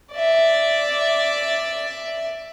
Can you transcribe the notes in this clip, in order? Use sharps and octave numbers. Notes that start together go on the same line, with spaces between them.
D5 E5